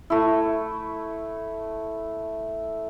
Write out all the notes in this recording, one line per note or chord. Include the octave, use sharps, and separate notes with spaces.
A3 E4